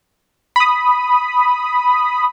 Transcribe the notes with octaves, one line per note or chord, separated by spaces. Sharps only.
B5 D#6